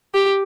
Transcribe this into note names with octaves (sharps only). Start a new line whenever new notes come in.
G4